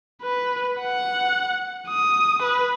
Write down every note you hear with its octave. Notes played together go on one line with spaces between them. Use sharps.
B4
F#5
D#6
B4